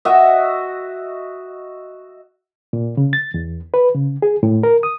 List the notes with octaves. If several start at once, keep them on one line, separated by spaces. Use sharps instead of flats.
F#4 D#5 E5
A#2
C#3
A6
E2
B4
C#3
G#4
A2
A#4
D#6